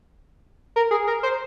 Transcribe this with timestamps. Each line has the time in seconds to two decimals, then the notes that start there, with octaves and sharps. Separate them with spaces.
0.76 A#4
0.91 G#4
1.07 A#4
1.23 C5